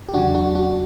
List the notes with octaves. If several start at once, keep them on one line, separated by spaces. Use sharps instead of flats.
G4
E2 C#3 F#3 D4 F#4
D4 F#4
D4 F#4